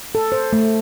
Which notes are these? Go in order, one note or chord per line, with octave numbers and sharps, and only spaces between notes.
A4
C5
A3